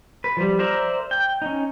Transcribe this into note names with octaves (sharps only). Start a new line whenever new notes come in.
B4
F3 G3
A#4 C5 D5 E5 A#5
G5
C#4 D#4